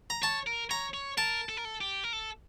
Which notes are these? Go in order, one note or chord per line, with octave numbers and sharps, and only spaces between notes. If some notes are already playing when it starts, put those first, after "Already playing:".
A#5
C#5 A5
A#4
C#5 A#5
C#5
A#4 A5
A4
A#4
A4
G4
A#4
A4